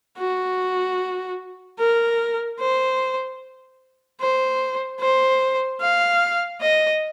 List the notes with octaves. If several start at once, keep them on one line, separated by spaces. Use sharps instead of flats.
F#4
A#4
C5
C5
C5
F5
D#5